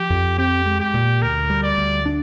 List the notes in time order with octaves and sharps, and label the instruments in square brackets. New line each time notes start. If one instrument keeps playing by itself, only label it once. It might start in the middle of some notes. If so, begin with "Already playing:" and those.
Already playing: [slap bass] F3 [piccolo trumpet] G4
[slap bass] F2
[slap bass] C4 [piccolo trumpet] G4
[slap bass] G#3
[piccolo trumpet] G4
[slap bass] A#2
[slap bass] D2 [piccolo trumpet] A#4
[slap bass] G3
[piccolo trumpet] D5
[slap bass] D2
D4